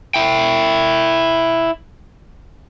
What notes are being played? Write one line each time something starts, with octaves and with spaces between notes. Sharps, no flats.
E4 G5